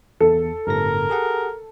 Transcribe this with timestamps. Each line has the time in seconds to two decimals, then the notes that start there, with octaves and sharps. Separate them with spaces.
0.20 E2 A4
0.67 G1 A2 A#4 A#6
1.10 G4 G#4 F#5